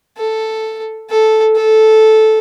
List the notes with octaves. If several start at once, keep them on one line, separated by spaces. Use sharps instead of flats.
A4
A4
A4